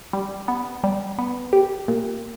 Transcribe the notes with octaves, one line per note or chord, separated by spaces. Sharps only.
G3
B3
G3
B3
G4
A#2